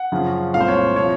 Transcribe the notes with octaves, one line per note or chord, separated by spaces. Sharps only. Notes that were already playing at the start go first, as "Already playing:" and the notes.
Already playing: F#5
F#2 C#3 F3
C2 A#2 A3 F5
C5
C#5
C3 F3 C#5